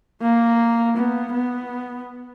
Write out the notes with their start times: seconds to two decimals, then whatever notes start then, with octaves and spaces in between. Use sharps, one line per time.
0.22 A#3
0.97 B3
1.33 B3